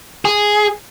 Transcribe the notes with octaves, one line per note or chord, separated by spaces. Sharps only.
G#4